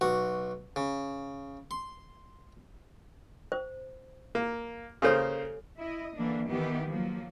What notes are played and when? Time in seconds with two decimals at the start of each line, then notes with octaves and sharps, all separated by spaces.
0.01 B1 F#4
0.76 C#3
1.71 C6
3.52 C5
4.35 A#3
5.02 C#3 A#3 G4 A4 C5 C#5
5.79 E4 D#5
6.16 D3 E3 A#3 D4
6.48 D#3 E3 B3 G4
6.88 F3 F#3 A#3